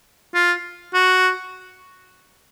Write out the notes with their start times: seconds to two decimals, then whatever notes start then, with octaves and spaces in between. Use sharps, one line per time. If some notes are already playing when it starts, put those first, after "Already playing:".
0.35 F4
0.94 F#4